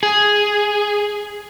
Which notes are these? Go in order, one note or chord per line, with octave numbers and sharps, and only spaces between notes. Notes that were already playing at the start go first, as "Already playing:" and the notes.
G#4